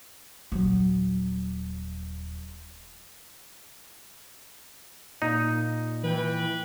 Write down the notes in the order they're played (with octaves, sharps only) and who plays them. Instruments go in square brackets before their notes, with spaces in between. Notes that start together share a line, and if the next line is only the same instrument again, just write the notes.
[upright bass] D#1 F#3
[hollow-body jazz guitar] A#2 [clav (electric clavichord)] D#4
[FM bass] E3 [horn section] B4 G5